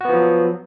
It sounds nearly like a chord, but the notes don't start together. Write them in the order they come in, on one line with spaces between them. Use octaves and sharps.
F#4 B3 F3 F#3